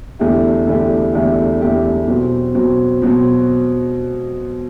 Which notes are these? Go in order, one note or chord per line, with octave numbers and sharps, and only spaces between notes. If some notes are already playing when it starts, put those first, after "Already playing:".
E2 D3 A3 E4 G4
E2 D3 A3 E4 G4
E2 D3 A3 E4 G4
E2 D3 A3 E4 G4
B2 F#3 C4
B2 F#3 C4
B2 F#3 C4